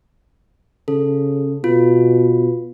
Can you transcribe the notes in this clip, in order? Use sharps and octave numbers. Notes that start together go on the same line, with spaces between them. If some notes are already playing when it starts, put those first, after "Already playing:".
C#3 A4
B2 F4